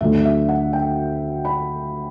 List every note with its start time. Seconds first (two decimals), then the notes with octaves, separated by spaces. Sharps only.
0.01 D2 D3 F#3 A3 E5
0.25 E5
0.48 F#5
0.73 G5
1.45 B5